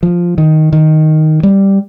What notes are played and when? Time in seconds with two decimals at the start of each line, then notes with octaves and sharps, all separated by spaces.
0.03 F3
0.38 D#3
0.73 D#3
1.43 G3